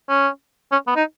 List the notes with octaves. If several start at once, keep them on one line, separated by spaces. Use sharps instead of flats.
C#4
C#4
B3
D#4